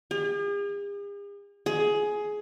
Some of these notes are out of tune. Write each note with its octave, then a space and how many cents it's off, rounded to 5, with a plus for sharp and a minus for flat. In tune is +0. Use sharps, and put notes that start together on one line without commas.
G#4 -45
G#4 +15